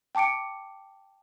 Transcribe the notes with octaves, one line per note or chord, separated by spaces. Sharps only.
G5 A5 D6 C#7 D7